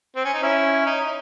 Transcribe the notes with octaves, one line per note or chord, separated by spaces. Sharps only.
C4
C#4
D#4
C#4 E4
D#4
D#4